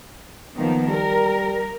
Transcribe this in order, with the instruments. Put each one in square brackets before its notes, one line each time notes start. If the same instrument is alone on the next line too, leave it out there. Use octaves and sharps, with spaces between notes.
[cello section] D#3 F3 A#3 [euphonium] B3
[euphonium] G3 [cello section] A#4